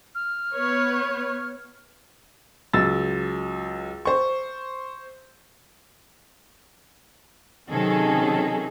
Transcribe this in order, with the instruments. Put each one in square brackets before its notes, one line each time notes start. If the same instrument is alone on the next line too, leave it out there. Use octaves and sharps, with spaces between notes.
[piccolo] F6
[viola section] B3 B4 C#5
[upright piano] C#2 F#3 E6 A6
C5 C#6
[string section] C3 D#3 F#3 C#4 G#4 A4